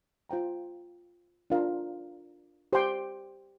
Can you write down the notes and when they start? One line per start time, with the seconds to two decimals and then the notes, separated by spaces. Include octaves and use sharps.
0.29 F4 C5 G5 A#5
1.50 D4 F4 A#4 F5
2.73 G4 C5 G5 C6